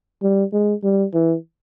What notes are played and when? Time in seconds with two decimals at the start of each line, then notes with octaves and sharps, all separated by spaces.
0.23 G3
0.53 G#3
0.83 G3
1.14 E3